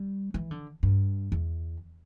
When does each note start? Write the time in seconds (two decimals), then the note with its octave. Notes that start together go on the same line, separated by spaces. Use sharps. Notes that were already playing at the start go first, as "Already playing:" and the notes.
Already playing: G3
0.34 E3
0.51 D3
0.83 G2
1.32 E2